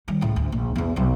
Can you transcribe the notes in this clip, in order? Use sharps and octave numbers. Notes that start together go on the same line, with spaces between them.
D#3 G3
C#2 A2
D2
A#1
E2 B3
B1 F#3